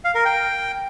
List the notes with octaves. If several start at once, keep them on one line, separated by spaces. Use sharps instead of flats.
F5
A#4
G5